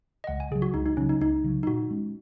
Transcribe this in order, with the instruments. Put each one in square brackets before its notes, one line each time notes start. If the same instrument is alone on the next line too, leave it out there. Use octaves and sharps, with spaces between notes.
[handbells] D#5
[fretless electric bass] C#2 [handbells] F#5
[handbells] G#5
[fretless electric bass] C#3 [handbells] G#4
[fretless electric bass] F#3
[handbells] F#4
[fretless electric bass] C#2 [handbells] D#4
[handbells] D#4
[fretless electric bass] C#3 F#3 [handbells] C#4
[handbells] D#4
[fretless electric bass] C#2 [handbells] D#4
[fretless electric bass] C#3 F#3
[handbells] D#4
[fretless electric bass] A#2 [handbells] F#4
[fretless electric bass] G#3 C#4